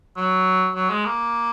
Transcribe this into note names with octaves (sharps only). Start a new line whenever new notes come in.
F#3
F#3
G#3
A#3